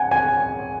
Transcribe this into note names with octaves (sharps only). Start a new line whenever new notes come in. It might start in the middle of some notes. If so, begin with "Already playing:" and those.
Already playing: F#5 G#5
G#5